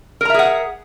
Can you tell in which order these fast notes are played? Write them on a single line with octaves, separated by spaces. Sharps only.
A#4 A#5 E5 G#4 F#5